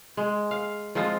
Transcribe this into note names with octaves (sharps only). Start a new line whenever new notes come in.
G#3
F5
F3 G#3 C4 F4